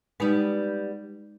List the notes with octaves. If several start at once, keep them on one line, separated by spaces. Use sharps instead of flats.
G3 G#3 B3 D#4